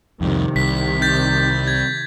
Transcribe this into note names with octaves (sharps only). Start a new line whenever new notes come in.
C2 F2 C3 D#3
C2 B6
G6 A6 B6
G#6